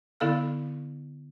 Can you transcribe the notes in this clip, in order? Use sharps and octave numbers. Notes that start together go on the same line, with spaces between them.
D3 B3 E4 A4 F5 F6